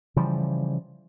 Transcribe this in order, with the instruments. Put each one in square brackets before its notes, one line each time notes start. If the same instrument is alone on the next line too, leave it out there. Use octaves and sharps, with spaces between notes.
[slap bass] C#3 E3 F3 G3